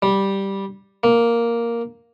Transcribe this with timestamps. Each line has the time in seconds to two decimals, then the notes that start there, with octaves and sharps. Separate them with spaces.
0.02 G3
1.04 A#3